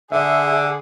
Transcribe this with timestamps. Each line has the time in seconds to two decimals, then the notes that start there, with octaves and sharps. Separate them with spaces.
0.12 D3 G#4 E5